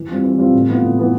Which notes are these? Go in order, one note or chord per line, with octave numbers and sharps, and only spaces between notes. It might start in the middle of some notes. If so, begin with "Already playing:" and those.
Already playing: E3
G3 C4 F4
E3
G3 C4 F4
A2
E3 B3 F4
A2
E3 B3 F4